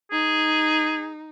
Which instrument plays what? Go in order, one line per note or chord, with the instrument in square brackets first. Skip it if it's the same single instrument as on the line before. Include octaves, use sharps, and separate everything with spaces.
[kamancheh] D#4 [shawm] G#4